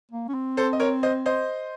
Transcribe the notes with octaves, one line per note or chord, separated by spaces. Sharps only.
A#3
C#4
C4
A4 C5
D#5
A#4 C#5
C5 D#5
C5 D#5